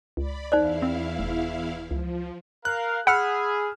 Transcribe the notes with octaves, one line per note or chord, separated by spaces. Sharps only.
C#2 D5 B5
E2 D#4 E4 C5 D5 F5
C4
F1
C#2 F3
A#4 F5 F#6
G#4 F#5 B5 E6 F6